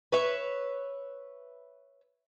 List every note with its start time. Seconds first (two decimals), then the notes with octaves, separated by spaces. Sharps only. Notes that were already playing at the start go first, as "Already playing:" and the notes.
0.12 B4 C#5 E5